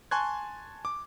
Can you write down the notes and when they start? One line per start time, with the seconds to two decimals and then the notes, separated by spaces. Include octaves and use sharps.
0.11 G#5 A5 C6 C#6 F#6 G#6
0.85 D6